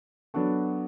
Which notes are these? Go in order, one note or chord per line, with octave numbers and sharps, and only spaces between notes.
F#3 B3 D4 F#4 A4